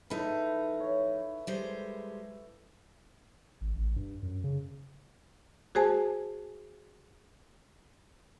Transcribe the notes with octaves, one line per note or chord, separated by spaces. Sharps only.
F3 D#4 E4 A4 B4
C#5
G3 G#3 C5
G#1
A1
G2
F#2
C#3
F#4 G#4 C5 G#5 A5